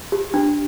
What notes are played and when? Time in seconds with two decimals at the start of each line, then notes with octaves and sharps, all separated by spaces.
0.12 G4
0.34 D4